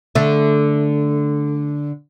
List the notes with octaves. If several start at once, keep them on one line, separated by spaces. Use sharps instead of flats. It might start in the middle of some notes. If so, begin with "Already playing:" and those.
D3 A3